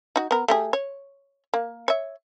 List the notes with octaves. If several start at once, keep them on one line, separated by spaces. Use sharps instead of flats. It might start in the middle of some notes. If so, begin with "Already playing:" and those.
D#4 F#4
B3 A#4
A3 G4 G#4
C#5
A#3
C#5 E5